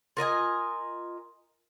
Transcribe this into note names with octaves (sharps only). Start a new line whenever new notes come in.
F4 A#4 D#5 G#5